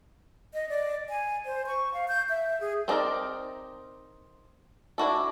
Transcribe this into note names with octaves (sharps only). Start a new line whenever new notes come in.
D#5
D5
G#5
C5
C#6
F5
G6
E5
G#4
C4 D4 D#4 A#4 D5
D4 E4 F#4 A4